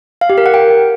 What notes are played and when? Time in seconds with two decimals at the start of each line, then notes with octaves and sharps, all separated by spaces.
0.21 F5
0.30 G4
0.38 A#4
0.46 F#5
0.54 G5